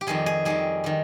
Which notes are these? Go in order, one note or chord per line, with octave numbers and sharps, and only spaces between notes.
G4
F2 D#3 G3 G#4
G#4
F2 D#3 G3 G#4
D#3 G3